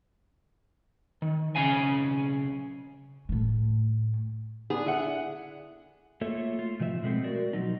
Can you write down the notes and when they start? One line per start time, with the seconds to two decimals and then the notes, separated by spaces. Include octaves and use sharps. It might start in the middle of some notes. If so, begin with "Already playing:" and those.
1.22 D#3
1.56 B1 C#3 C#4 F5 G#5
3.29 A2 A3
4.70 B3 D4 G#4
4.86 D3 E4 F#5
6.21 A3 A#3 F4 A4 C#5 E5
6.59 F4
6.80 A2 C3 F3 C#5 E5
7.02 B2 G#3 A3 C4
7.24 F#4 A#4 D5
7.53 B2 F3 F#3 D#4